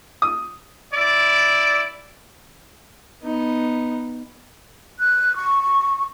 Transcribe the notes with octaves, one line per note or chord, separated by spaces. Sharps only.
D#6
E4 D5
B3 D#4
F#6
C#6